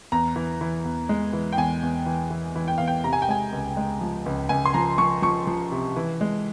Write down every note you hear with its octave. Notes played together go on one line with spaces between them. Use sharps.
E2 A#5
E3
E3
E2
G#3
E3
G5
E2 G#5
E2
E3
E3
E3
G5
E2 F5
G5
C3 A#5
G#5
G5
G#3 G#5
C#2
G#3
F3
C#2
C#2 G#5
C6
F3 A#5
F3 C#6
F3 C#6
F3
C3
E3
G#3